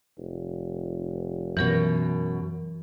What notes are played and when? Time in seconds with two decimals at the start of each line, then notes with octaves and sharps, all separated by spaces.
0.17 F1
1.57 F#2 B2 E3 A#4 A#6